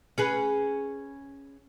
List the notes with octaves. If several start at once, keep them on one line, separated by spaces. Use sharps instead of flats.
C#4 G#4 B4